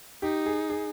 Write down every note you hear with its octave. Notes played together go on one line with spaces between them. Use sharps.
D#4 G4
G#4
G#4